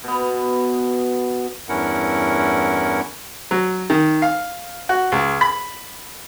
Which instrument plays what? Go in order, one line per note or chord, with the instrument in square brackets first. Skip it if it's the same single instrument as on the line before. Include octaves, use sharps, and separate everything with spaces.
[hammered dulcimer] B2 B3
[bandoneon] E2 G2 C#4 E4 A#4 F#5
[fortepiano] F#3
D#3
F5
F#4
C#2
B5